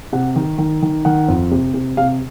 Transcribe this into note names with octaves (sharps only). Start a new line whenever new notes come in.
C3 F#5
D#3
D#3
D#3
D#3 F#5
F2
C3
C3
C3 F5